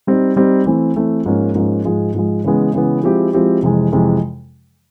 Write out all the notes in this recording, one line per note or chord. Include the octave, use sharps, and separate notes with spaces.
G3 C4 D#4
G3 C4 D#4
E3 A3 C4
E3 A3 C4
G#2 F3 A#3 C#4
G#2 F3 A#3 C#4
G#2 F3 G#3
G#2 F3 G#3
C#3 E3 G#3 B3
C#3 E3 G#3 B3
F3 G#3 C4 E4 G4
F3 G#3 C4 E4 G4
F2 C3 E3 G#3
F2 C3 E3 G#3